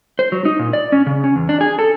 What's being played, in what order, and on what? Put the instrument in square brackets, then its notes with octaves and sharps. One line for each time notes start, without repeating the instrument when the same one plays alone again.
[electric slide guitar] C5
F#3
D#4
A#2
D5
C#4
C#3
C#4
E2
D4
G#4
A4